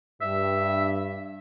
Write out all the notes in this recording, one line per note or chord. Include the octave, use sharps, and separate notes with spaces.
G2 E5